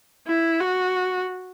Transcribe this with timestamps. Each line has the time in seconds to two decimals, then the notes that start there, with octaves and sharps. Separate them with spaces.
0.27 E4
0.60 F#4